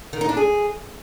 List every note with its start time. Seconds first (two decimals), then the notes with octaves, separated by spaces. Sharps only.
0.13 D#3
0.21 D#4
0.29 D4
0.37 G#4